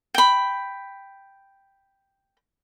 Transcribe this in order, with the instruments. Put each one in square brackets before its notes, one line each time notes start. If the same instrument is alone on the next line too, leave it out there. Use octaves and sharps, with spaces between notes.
[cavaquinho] G5 B5